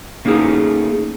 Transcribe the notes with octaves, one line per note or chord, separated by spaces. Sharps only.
A3 A#3 C#4 D#4 G#4